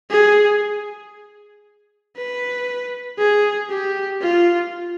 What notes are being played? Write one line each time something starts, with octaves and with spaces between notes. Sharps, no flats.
G#4
B4
G#4
G4
F4